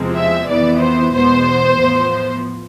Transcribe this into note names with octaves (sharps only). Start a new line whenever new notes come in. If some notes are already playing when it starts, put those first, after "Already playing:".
Already playing: E2 C3 F3 G#3 C4
E5
F2 E3 B3 D5
C5
E2 B2 G#3 B3 C5
A2 F3 B3